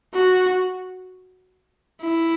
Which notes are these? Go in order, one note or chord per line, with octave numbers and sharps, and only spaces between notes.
F#4
E4